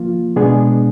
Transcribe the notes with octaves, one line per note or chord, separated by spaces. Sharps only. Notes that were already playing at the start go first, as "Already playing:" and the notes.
Already playing: F3 A#3 F4
B2 G#3 B3 D4 G#4